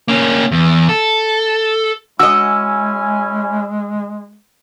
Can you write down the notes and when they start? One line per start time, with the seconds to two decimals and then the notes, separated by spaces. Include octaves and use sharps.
0.08 A#3 C#4
0.52 E2
0.89 A4
2.19 G#3 C#4 E4 F#4 D#5 G#5 E6